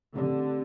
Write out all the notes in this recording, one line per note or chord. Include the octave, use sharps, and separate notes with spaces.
D3 A3 C4 G4 D5